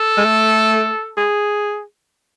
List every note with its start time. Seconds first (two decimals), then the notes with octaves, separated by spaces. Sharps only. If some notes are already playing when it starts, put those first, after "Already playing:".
Already playing: A4
0.18 G#3
0.25 A3
1.18 G#4